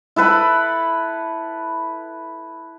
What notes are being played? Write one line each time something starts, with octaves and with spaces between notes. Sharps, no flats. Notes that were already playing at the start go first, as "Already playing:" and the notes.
E4 A4 B4 B5